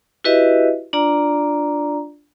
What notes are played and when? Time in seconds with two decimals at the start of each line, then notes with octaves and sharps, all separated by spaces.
0.24 E4 F#4 G4 B4 D#5 E5
0.93 D4 F4 D5 A#5